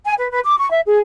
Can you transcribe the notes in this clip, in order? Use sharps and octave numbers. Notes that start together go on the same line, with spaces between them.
G#5
B4
B4
D6
C#6
E5
G#4